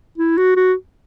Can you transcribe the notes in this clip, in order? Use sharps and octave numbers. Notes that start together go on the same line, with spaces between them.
E4
F#4
F#4